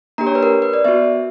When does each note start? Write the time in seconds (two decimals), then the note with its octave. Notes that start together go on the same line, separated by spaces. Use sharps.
0.18 A#3 D4 G4 A#5
0.27 C#5
0.35 B4
0.43 A#4
0.62 B4
0.73 D5
0.85 B3 F#4 E5